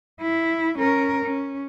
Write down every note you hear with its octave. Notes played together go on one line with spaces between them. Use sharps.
E4
C#4 A#4
C#4